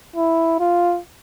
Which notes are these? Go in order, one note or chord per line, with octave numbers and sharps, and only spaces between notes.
E4
F4